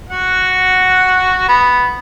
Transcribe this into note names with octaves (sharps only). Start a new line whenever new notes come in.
F#4 F#5
B3